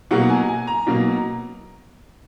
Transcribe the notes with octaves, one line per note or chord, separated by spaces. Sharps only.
B2 F#3 A#3 F#5
G#5
G#5
A#5
B2 F#3 A#3